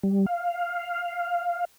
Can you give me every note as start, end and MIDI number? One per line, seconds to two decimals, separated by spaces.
0.03 0.26 55
0.26 1.65 77